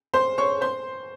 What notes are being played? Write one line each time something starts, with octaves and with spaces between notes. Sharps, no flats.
C5 C6
C#5 C#6
C5 C6